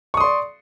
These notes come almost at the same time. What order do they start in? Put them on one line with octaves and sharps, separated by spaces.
C#6 D#6 C6 D5